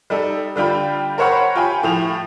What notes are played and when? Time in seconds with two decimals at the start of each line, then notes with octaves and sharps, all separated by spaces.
0.10 G3 D#4 A4
0.56 D3 G3 F4 G5 B5
1.18 A#4 C5 C#5 F#5 B5
1.55 F4 G4 G5 G#5 B5
1.83 A2 F3 F7